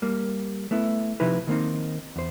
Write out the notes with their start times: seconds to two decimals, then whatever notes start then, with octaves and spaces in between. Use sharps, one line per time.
0.02 G3 A#3
0.71 A3 B3 E4
1.20 C3 F3 D#4 E4 B4
1.47 D#3 A#3 C4 D#4
2.16 E2 C5